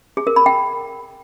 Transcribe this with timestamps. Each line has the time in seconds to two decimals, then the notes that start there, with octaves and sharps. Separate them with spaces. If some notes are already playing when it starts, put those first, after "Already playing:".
0.17 G#4
0.27 A#4
0.36 B5
0.46 G5